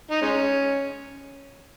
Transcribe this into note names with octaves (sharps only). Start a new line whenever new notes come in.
D#4
G#3 C#4